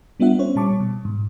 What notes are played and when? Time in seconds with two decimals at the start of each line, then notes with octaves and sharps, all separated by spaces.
0.20 G3 B3 D4 F4 E5 F#5
0.39 C#4 C5 C#5
0.56 A#2 G3 A5 C#6 D6
0.80 B2
1.05 G#2